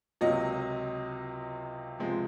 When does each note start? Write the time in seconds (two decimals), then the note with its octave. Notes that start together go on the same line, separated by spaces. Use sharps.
0.21 C#2 C3 F#3 A#3 D#5
1.98 C#2 C3 F3 G#3 C4